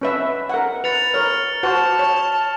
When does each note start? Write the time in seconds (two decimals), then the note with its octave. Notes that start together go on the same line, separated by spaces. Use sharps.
0.01 C#4 B4 E5
0.50 A#4 F#5
0.84 B4 A6 C#7 F7
1.14 A#4 C#5 F6
1.63 F#4 C5 F#5 A5
1.99 C#5